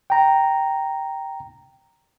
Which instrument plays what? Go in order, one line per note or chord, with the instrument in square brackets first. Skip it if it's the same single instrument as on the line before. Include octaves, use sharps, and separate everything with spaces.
[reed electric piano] G5 A#5